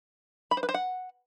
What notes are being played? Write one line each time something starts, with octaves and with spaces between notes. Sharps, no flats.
B5
C5
B4
C5
F#5